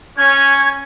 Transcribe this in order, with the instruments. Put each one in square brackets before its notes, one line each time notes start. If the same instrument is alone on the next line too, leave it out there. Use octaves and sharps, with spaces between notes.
[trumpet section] C#4 [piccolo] G#6